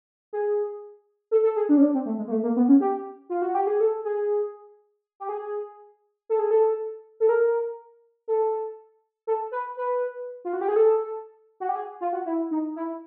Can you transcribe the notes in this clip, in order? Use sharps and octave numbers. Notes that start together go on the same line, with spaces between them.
G#4
A4
A4
G#4
D4
C#4
D4
C4
A3
G#3
A#3
A3
A#3
B3
C#4
G4
F4
F#4
G4
G#4
A4
G#4
G4
G#4
A4
G#4
A4
A4
A#4
A4
A4
B4
B4
F4
F#4
G4
G#4
A4
F#4
G4
G#4
F4
F#4
E4
D#4
E4